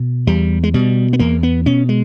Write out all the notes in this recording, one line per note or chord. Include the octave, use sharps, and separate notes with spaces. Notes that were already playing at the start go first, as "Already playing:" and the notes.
Already playing: B2
E2 G3
G#3
B2 G3
B3
E2 A#3
B3
B2 C#4
G#3